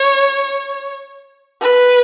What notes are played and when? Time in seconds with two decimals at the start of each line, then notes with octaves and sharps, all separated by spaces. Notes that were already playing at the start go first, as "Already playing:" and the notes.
Already playing: C#5
1.61 B4